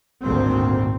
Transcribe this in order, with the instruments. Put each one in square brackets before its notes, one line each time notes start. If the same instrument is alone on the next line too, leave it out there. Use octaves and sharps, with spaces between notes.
[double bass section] G#1 D2 A#2 C4